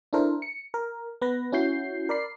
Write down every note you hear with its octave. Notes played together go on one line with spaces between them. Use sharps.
D4 E4 A4 A#4 C5
C#7
A#4
B3 B4 A#6
C#4 E4 F#4 G6 C7
A#4 D5 B5 C7